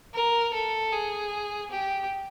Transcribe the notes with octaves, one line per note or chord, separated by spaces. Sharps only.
A#4
A4
G#4
G4